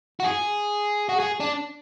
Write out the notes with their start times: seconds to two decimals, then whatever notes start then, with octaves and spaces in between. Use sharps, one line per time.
0.20 F#4
0.24 G#4
1.09 F#4
1.20 G#4
1.40 D4